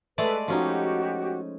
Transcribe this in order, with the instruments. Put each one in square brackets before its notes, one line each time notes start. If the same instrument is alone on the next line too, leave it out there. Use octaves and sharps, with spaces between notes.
[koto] G#3 A3 D5 [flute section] A4 B4
[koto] F3 C#4 D#4 [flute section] F#4 G4